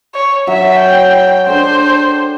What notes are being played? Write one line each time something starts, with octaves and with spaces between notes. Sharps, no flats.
C#5
F#3 F#4 E5
G5
D4 A4 C5 G5